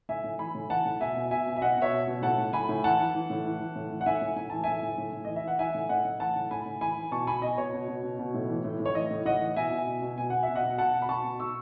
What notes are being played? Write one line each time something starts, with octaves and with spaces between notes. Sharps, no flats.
A2 E5 G#5
A2
E3 G#5 B5
A2
E3 F#5 A5
A2
B2 E5 G#5
B2
B2 E5 G#5
B2
E5
B2 D#5 F#5
B2
C#5 E5
B2
B2
A2 F#5 A5
A2
A2 G#5 B5
A2
E3 F#5 A5
E3
E3
A2
E3
E3
A2
E3
F#5
A2 E5 G#5
A2
A2 G#5
E3 A5
A2 E5 G#5
A2
A2
A2
E3 D#5
E5
E3 F#5
E3 E5 G#5
A2
A2 D#5 F#5
A2
E3 F#5 A5
A2
A2 G#5 B5
A2
E3 G#5 B5
E3
B2 A5 C#6
B2 G#5 B5
B2 D#5
B2 C#5
B2
B2
B2
B2
A2
E3
A2
A2
C#5
E3 D#5
A2
A2 D#5 F#5
E3
B2 E5 G#5
B2
B2
B2
B2 G#5
B2 F#5
E5
B2
D#5 F#5
B2
B2 F#5 A5
B2
B5
B2 A5 C#6
B2
B2 C#6 E6